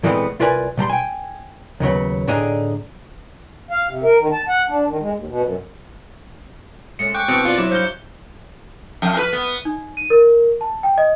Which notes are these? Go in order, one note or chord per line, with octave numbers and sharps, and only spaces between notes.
A#2 E3 G#3 A3 B3 C4
C2 F4 A#4 B4 D5 G#5
B2 G3 A#5 C6
G5 G#5
D#2 C#3 F#3 B3
A2 D3 D4 D#4 G#4 D#5
F5
C3
A#4
D#3
A5
F#5
D4
D#3
G#3
D#2
B2
F#2
G#3 A3 C#4 C#7
G5 C#6 D6 F#6
G2 B2 E3 C4
F4 D5
F#3 E4 C5 D6
G2 D#5 F5 G6 G7
F2
B4
B3
D#4
D#7
A#4
A5
G5
D#5